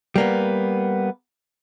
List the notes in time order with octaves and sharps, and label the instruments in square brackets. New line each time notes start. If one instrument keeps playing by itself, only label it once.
[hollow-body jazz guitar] G3 A#3 B3